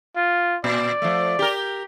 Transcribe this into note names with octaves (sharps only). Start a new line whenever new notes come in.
F4
A#2 D5
F3 A3
G4 A#4